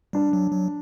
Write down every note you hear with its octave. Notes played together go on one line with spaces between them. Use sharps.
G3 D4
F#3
F#3